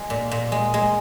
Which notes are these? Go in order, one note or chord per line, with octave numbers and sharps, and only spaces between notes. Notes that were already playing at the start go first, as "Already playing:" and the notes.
Already playing: G#3
A#2
A#2
G#3
G#3